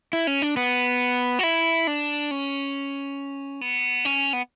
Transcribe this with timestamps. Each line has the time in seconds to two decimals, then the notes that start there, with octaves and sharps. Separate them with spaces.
0.13 E4
0.27 C#4
0.42 D4
0.57 B3
1.39 F#4
1.43 E4
1.87 D4
2.31 C#4
3.61 B3
4.05 C#4
4.33 B3